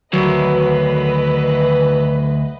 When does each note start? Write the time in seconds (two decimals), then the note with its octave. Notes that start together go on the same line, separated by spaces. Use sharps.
0.13 D2 D#3 F#3 B4 D#5